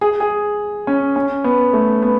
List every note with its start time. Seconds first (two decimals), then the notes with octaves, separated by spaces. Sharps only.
0.01 G#4
0.20 G#4
0.87 C#4
1.16 C#4
1.44 B3
1.73 A3
2.02 B3